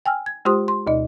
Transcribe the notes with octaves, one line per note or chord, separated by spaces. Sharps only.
G5 G#5 E6 F6
G#6
G#3 F4 G4 C5 C6 D#6
C6
D2 B2 D#4 D#5